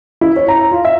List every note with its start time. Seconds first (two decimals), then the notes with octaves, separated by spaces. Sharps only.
0.21 E4
0.36 C#5
0.48 A#5
0.71 F4
0.85 E5